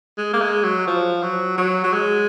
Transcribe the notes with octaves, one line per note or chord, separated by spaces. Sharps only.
G#3
A#3
G#3
F#3
F3
F#3
F#3
F#3
G#3